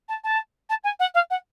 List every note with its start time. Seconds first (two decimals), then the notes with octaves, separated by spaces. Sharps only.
0.09 A5
0.24 A5
0.70 A5
0.84 G#5
1.00 F#5
1.15 F5
1.31 F#5